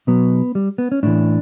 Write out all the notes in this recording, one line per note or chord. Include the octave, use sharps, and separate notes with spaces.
B2 F#3 B3
G3
B3
C#4
A2 E3 D4